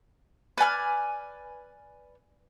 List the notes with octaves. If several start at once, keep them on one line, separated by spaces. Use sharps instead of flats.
B4 D5 G#5 F6